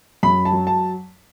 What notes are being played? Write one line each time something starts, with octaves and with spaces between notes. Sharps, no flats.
F#2 B5
A5
F#3
A5